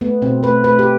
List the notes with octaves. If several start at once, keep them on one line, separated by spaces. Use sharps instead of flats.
A3 B3
B2 C4
A3 B4
A3 B4
G4